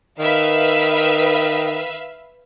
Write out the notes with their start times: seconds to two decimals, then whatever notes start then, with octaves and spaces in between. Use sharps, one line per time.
0.19 D#3 B4 E5 F5